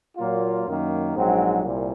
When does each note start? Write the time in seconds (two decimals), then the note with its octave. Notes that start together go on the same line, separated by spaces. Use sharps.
0.18 A#2 F#3 A#3 F4
0.66 F#2 D#3 A#3
1.15 A#1 G#2 F#3 C4
1.64 C2 A#2